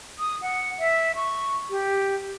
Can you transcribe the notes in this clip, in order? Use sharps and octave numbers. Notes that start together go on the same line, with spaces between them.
D#6
F#5
E5
C#6
G4